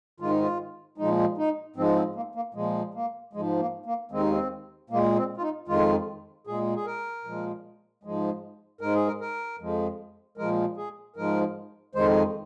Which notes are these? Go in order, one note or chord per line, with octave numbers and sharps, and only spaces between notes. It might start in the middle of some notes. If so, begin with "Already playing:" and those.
G#2 D#3 G#3 F4
D#4
F4
A#2 F3 G#3 D#4
D#4
G#2 F3 G#3 C4
C4
A#3
A#3
A#2 F3 G#3
A#3
G#2 F3 G#3
A#3
A#3
D#2 D#3 G#3 C4
D#4
C4
A#2 G#3 A#3
C4
F4
D#4
F2 D#3 G#3 F4
A#2 G#3 G#4
G#4
A#4
A#2 F3 G#3
G#2 F3 G#3
G#2 G#3 A#4
G#4
A#4
A#4
F2 F3 G#3
A#2 F3 G#3 A#4
G#4
G#2 F3 G#3 A#4
F2 D#3 G#3 C5